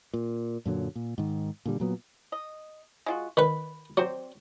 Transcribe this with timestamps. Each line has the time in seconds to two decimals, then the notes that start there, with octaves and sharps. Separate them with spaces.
0.14 A#2
0.66 F#2 A#2 D3 F#3
0.96 A#2
1.18 G#2 D#3
1.66 A#2 D3 G3
1.80 A#2 F#3 B3
2.32 D#5
3.06 G#3 F4 F#4
3.37 D#3 B4 B5
3.97 F#3 C4 C5 D5